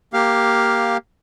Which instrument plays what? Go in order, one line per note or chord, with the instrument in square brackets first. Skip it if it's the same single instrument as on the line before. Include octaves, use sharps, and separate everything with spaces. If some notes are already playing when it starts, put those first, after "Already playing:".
[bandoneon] A#3 G4 F5